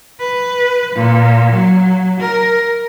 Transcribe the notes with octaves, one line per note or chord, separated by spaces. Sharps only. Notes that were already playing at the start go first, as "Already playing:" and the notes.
B4
A#2
F#3
A#4